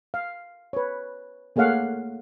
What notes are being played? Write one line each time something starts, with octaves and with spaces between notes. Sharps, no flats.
F5
B4 C#5
A3 A#3 G#4 C#5 F5 F#5